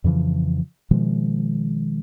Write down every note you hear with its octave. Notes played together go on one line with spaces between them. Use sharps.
F2 C#3 E3 F3
B2 D#3 F3 G#3